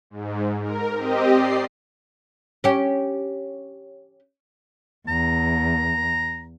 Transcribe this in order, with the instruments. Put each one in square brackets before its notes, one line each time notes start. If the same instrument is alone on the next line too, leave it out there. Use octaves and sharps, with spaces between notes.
[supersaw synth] G#2
A#4
C4 G4 D#5
D5 C7
[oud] C#4 G4
[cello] E2 [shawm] A#5